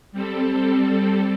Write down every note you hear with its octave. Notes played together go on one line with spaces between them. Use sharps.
G3 C4 A4